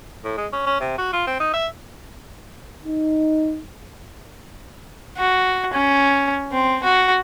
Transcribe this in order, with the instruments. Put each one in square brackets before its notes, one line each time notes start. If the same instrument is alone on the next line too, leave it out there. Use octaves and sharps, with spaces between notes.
[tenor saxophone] A2
G#3
C#4
C#4
C3
F#4
F4
C4
D#4
E5
[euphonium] D#4
[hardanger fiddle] F#4
C#4
C4
F#4